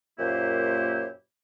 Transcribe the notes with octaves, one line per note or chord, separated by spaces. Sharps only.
F#2 A#2 A#3 E4 G4 C5